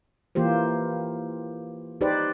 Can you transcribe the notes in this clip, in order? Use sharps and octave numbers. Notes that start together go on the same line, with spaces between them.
E3 A#3 F4 G4 C5
D#4 G4 B4 C5 D5